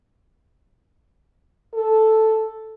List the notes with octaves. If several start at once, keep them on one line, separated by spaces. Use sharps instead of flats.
A4